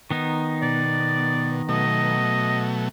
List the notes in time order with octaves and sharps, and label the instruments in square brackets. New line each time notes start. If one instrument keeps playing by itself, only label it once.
[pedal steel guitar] D#3 B3 D#4
[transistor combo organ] B2 [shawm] D5
[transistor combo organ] B2 F#3 A3 [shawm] D#5